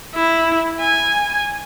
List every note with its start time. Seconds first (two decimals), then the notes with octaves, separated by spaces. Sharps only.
0.15 E4
0.80 G#5